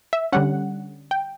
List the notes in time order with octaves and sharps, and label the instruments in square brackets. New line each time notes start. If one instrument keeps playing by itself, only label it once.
[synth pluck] E5
D3 G3 C#4 F#5
G5